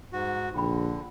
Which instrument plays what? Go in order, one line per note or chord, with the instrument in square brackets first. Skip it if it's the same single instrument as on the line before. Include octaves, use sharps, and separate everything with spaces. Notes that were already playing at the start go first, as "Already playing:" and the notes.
[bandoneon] G#2 F#4
[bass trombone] A#1 [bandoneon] D3 [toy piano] F4 G5 B5